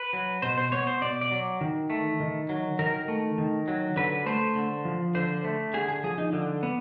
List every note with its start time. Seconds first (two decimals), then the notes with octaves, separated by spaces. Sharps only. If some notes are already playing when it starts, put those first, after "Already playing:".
Already playing: B4
0.13 F#3
0.42 B2 C5
0.58 C5
0.72 B3 C#5
0.87 C5
1.01 B2 D5
1.21 D5
1.31 F#3
1.61 D#3
1.90 A3
2.20 D#3
2.49 F#3
2.79 D#3 A#4
3.08 A3
3.38 D#3
3.68 F#3
3.96 D3 B4
4.26 A3 C5
4.56 D3
4.85 F3
5.15 D3 C5
5.44 A3
5.74 D3 G#4
5.88 G#4
6.03 F3 G#4
6.18 D#4
6.33 D3
6.63 B3